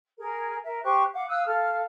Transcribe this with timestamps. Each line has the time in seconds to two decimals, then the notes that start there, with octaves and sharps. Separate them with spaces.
0.19 G#4 A#4
0.65 A#4 E5
0.83 G4 C5 C#6 F#6
1.12 F5 F#5 D6
1.28 F5 D#6 E6 F#6
1.46 A4 F5 F6